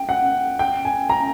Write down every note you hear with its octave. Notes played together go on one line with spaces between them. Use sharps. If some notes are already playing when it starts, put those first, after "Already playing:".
Already playing: G5
F#5
G5
G#5
A#5